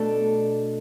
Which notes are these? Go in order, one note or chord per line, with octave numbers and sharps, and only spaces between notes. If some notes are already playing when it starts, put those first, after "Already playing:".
Already playing: B2 A3 D4 A4